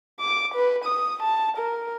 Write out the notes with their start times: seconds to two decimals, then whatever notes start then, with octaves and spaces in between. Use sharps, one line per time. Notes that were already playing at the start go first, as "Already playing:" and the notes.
0.20 D6
0.54 B4
0.85 D#6
1.23 A5
1.58 A#4